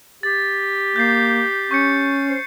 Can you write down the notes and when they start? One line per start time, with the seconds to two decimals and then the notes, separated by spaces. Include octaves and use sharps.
0.23 G4 A6
0.96 A#3 G6 A6 C7
1.71 C#4 C#6 G6 C#7
2.30 C5